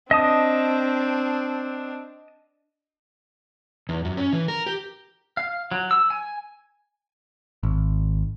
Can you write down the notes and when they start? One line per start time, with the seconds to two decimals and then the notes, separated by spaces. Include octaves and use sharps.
0.11 C4 D4 D#5 A5 D#6
3.89 E2
4.05 F#2
4.17 C#4
4.33 E3
4.48 A#4
4.66 G4
5.37 F5
5.71 F#3
5.91 E6
6.10 G#5
7.63 G#1